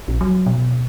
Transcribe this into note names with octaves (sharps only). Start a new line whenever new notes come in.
A#1
F#3
B2